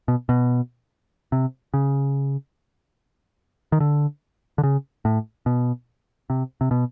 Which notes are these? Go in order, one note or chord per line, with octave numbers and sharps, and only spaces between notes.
B2
B2
C3
C#3
D#3
D3
D3
C#3
A2
B2
C3
C3
B2